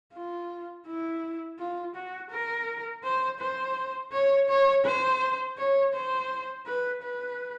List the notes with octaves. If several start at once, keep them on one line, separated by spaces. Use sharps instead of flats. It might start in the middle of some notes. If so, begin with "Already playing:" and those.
F4
E4
F4
F#4
A#4
C5
C5
C#5
C#5
C5
C#5
C5
B4
B4